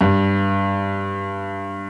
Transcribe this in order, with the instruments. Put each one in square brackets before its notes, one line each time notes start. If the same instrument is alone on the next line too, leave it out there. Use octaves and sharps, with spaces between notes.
[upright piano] G2